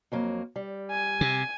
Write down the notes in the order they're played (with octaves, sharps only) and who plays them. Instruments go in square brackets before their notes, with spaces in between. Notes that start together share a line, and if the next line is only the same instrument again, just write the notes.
[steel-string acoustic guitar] F2 F#3 A#3
G3
[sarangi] G#5
[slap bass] C3